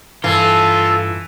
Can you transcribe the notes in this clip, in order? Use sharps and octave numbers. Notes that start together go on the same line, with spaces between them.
G2 E3 F4 A4